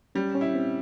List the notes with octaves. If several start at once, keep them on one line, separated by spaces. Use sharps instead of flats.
G3 C#4
C#4
E4
C4